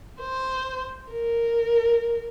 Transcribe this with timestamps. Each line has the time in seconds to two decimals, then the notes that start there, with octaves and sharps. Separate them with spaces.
0.21 C5
1.11 A#4